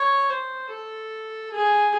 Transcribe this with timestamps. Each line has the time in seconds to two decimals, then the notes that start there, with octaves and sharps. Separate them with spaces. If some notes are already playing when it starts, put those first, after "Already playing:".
Already playing: C#5
0.30 C5
0.70 A4
1.52 G#4